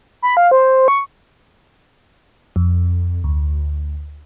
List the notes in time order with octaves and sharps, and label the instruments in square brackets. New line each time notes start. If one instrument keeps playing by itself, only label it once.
[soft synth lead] B5
F5
C5
C#6
[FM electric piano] F2
D2